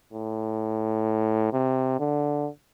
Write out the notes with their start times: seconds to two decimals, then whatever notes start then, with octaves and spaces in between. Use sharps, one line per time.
0.13 A2
1.53 C3
1.99 D3